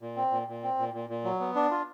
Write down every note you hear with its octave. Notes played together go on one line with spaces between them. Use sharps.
A#2
C4
A#2
A#2
C4
A#2
A#2
A#2
F#3
B3
D4
F4